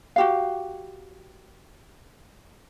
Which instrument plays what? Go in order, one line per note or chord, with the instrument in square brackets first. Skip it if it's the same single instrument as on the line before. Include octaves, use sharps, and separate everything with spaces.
[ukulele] F#4 G4 F5